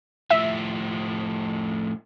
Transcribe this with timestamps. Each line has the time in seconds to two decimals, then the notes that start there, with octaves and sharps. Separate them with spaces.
0.31 A2 F3 E5